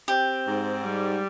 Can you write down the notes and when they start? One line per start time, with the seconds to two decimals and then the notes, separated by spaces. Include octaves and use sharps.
0.08 C4 G4
0.47 G#2
0.84 G3